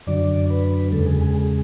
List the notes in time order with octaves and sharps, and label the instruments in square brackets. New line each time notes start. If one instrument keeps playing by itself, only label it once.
[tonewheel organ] F#2 D3 F#3 D5
B4
E2 C#3 G#3 A4
G#4
G#4
G#4